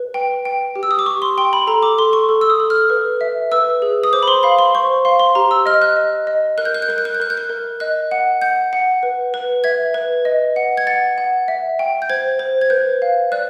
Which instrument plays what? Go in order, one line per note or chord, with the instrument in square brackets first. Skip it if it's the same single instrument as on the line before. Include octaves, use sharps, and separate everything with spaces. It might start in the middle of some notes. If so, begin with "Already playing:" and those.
Already playing: [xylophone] B4
G5
G5
G4
E6
D#6
D6
G4 C#6
C6
G5 C6
B5
A4 A#5
D6
A4 C6
C#6
A4
E6
D#6
A4
F6
B4
E5
B4 E6
G#4
D#6
C5 D6
B5
C6
F5 B5
C6
C5 C#6
F5 C6
C6
G4 A#5
E6
D#5 F6
F#6
D#5
D#5
A#4 F#6
G6
F#6
G6
A#4 F#6
G6
F#6
G6
A#4 F#6
G6
F#6
A#4
D#5 F#6
F#5
F#5 G6
F#5
B4
B4
E5 G#6
B4
D#5
F#5
G#6
F#5 A6
F#5
E5
G5
G6
C5 G#6
C5
G#6
B4 G6
F5
D5 F#6